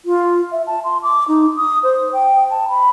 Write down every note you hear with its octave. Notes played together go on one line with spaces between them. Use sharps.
F4
E5
A5
C6
D6
D#4
D#6
C5
G5
A5
B5